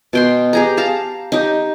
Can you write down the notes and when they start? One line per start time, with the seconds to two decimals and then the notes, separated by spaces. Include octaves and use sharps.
0.13 B2 G5 C6
0.53 G4 G#4 A#5
0.77 F5 A5 A#5
1.32 D#4 G4